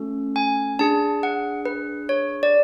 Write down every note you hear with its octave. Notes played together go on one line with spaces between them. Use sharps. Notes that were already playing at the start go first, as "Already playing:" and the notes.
Already playing: A3 C#4 F#4 A4
G#5
D4 G#4 A5
F#5
B4
C#5
D5